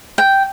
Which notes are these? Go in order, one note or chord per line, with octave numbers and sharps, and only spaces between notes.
G5